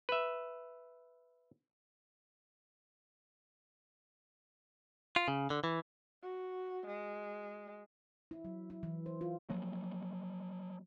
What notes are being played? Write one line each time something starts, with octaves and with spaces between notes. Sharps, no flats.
B4 E5
F4
C#3
D3
E3
F#4
G#3
E4
F#3
E4
E3
C5
F4
F3 F#3 A#3